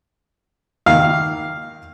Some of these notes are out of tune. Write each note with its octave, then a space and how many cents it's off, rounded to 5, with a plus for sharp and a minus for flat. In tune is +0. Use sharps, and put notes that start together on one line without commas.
D#3 +0 A#3 +0 F5 +0